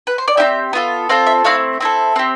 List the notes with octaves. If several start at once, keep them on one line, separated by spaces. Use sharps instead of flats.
B4
C5
D5
C4 E4 G4 E5
B3 F4 A4
C4 F4 A4 F5
E5
A3 C4 E4 F5
C4 E4 A4
C4 G4